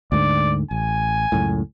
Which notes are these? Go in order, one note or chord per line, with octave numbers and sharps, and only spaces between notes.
D2 G#2 D3 D5
A1 G#5
C#2 F#2 A2